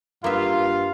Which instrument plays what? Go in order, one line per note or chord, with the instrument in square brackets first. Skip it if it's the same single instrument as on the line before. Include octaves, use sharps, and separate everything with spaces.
[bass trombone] G2 [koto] A#3 B3 E5 [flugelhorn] F4 [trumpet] F5